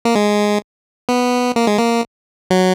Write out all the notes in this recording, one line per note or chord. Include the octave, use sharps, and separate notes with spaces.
A#3
G#3
B3
A#3
G#3
A#3
F#3